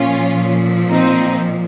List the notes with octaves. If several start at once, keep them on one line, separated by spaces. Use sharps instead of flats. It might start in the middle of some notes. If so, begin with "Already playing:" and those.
Already playing: A#2 F3 C#4 F4
C4 D#4